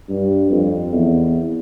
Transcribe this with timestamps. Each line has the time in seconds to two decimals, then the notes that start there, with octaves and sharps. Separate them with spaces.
0.09 G2
0.51 F2
0.93 E2